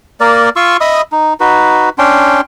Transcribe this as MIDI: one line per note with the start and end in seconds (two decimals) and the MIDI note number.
0.20 0.49 58
0.20 0.49 70
0.20 0.49 74
0.56 0.77 65
0.56 0.77 84
0.56 0.77 85
0.56 0.77 88
0.81 1.01 75
0.81 1.01 76
0.81 1.01 83
0.81 1.01 87
1.12 1.34 63
1.40 1.89 63
1.40 1.89 66
1.40 1.89 71
1.98 2.41 61
1.98 2.41 62
1.98 2.41 79
1.98 2.41 84